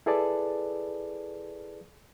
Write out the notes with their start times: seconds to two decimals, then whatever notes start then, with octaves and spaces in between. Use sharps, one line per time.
0.06 E4 G#4 A4 B4 D5 A5